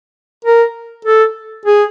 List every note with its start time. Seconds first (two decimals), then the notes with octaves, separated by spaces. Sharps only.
0.45 A#4
1.05 A4
1.65 G#4